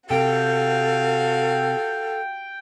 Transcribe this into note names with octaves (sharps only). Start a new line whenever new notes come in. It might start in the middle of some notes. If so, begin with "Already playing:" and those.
C3 F#4 A4 F5 G5